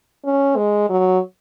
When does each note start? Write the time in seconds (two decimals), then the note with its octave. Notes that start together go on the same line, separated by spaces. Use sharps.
0.25 C#4
0.57 G#3
0.90 F#3